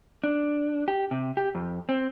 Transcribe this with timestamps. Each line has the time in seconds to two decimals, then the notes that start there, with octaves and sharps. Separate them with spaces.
0.24 D4
0.88 G4
1.11 C3
1.37 G4
1.55 F2
1.89 C4